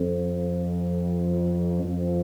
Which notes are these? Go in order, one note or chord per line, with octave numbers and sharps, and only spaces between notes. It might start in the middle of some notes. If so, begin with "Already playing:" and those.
Already playing: F2
F2